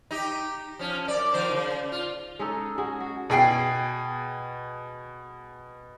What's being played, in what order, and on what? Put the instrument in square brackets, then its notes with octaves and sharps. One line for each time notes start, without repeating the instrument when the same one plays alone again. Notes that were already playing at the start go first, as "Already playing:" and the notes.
[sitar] D#4 G4
F3 C#4
F#2 D5
D#3 F3 C5
C#3
F4
[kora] G#3 C#4 D#4 A4
G#3 F#4 G#4
F#4
[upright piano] B2 G#4 G5 C7